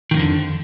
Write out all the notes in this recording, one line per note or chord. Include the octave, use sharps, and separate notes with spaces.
F2 G#2 D3 D#3